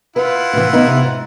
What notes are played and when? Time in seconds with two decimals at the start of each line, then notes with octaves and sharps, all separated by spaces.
0.16 E4 F4 B4 F#5
0.53 A2 E3
0.73 B3 D#4
0.87 C3
1.03 G#2